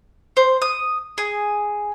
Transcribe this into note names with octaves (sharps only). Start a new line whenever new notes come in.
C5
D#6
G#4